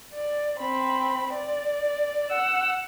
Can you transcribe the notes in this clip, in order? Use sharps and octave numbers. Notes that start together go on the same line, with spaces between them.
D5
C4 B5
D5
F#5 E6